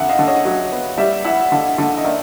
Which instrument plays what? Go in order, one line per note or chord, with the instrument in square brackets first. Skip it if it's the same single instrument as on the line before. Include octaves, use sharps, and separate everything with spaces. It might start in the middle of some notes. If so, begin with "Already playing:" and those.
Already playing: [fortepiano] F2 D3 [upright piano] E5 F#5
[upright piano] D#5 F5
[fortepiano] D3
[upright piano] C#5 D#5
[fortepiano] F#3
B3
[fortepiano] G3 [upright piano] D5 E5
[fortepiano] E4 [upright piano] E5 F#5
[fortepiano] D3 [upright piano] D#5 F5
[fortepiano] D3
[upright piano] D#5
[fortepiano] D#3 [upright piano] D5 E5